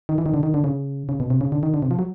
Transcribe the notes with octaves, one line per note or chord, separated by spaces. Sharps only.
D#3
E3
D#3
D3
D#3
D3
C#3
C#3
B2
C3
C#3
D3
D#3
D3
C3
F3
F#3